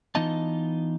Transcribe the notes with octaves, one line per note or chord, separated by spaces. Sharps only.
E3 B3 D#4 F4 D#5 A5